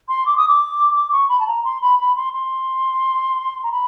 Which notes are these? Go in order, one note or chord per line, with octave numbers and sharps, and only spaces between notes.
C6
D6
D#6
D6
D6
C#6
B5
A5
A#5
C6
B5
B5
C6
C6
A#5
B5